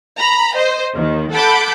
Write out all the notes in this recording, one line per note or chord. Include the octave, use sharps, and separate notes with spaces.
A#5 B5
C5 D#5
D#2 D#3
A4 F#5 A5 B5 D6 G6